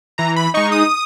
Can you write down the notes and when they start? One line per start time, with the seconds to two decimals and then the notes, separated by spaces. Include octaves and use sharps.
0.18 E3 A#5
0.36 B5
0.54 G#3 D#4 C#6
0.72 D#6